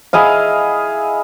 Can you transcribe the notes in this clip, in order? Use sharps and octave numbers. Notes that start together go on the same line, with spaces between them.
E4 G#4 D#5 F5